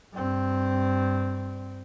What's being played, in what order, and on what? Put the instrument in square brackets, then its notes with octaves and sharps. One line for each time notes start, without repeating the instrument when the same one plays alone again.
[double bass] G2 C4